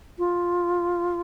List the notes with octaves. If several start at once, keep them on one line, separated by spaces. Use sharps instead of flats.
F4